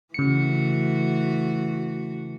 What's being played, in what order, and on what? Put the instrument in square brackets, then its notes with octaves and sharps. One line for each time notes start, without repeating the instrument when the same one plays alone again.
[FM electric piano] C#3 C#7 [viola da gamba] E3 A3 F#4